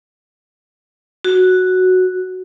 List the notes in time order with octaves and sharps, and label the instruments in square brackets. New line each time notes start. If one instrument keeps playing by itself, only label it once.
[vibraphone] F#4